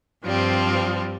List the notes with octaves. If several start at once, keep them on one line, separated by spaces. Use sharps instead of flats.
G2 F3 G3 C4